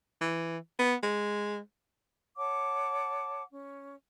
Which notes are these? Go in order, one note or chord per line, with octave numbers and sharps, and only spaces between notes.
E3
B3
G#3
C#5 F#5 A5 D6
C#4